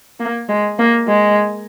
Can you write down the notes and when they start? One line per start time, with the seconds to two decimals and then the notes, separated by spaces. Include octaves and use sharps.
0.20 A#3
0.48 G#3
0.79 A#3
1.07 G#3